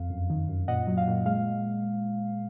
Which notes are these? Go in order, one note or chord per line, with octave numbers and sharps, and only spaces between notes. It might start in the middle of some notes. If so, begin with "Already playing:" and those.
Already playing: F2 F5
F#2
D#3
F#2
A#2 D#5 F#5
F#3
F5
A#2
G#3 F5